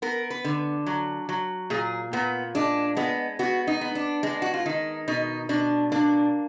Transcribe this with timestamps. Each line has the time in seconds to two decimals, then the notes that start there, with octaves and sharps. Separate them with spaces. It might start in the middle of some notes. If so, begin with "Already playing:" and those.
0.02 B3 A#4
0.30 B4
0.45 D3
0.87 F#3
1.29 F#3
1.70 A#2 G#4
2.13 A#2 B3
2.55 G#3 D4
2.97 G#3 B3
3.39 B3 F#4
3.67 D#4
3.81 B3
3.95 D4
4.23 G#3 D4
4.42 F#4
4.54 F4
4.66 D#3 D#4
5.08 B2 D#4
5.49 B2 D4
5.92 A#3 D4